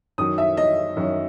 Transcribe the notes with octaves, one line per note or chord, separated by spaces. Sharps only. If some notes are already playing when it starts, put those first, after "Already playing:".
F#2 D#3 F#3 D#6
E5
D#5
F#2 D#3 F#3